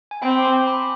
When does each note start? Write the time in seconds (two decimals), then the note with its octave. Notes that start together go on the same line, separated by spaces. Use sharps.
0.11 G#5
0.22 C4 G5 B5
0.38 D6
0.44 G#5 C6
0.67 B5 D6